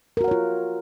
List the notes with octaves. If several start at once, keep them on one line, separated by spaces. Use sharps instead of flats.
F4 F#4 A#4 C#5 F#5